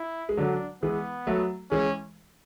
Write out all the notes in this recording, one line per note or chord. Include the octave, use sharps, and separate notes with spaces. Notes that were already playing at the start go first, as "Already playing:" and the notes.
Already playing: E4
G#3
D3 F#3 D4
E3 G#3 B3
F#3 A3
E3 G#3 C#4